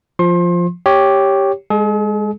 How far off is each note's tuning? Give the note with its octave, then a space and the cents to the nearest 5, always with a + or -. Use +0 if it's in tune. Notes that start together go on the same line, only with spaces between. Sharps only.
F3 +0 C6 +30
G4 +0 C#5 +0
G#3 -15 G#4 +45